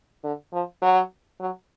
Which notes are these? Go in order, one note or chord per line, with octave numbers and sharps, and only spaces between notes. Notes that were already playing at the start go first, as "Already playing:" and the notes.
D3
F3
F#3
F#3